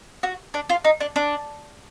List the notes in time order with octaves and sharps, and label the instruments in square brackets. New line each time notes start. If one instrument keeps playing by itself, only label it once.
[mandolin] F#4
D4
F4
D#4
D4
D4